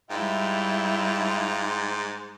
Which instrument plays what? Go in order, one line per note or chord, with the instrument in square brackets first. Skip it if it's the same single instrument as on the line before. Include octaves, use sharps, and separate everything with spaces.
[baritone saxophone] G#2 [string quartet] G3 E4 [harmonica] F4 E5 G5